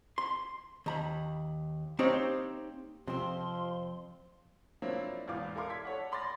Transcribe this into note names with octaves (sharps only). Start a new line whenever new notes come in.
C6
D#2 A#5 B5
A#3 C4 D#4 G4 C5 C#5
F2 C3 F3 C4 C6
F3 F#3 A#3 C4 D4 E4
E1 E2 A2 F5 D6
E4 A4 A#4 F5 C6 D6
G#6 B6
A4 C#5 F#5
B5 C6 D6 A6 A#6